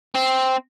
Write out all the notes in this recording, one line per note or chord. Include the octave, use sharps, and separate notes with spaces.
C4